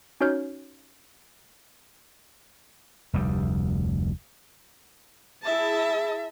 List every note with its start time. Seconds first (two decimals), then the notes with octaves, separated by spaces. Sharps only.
0.21 C#4 D#4 F#4 C#5 F6 G6
3.13 F1 D2 G3
5.45 E4 G#4 E5 A5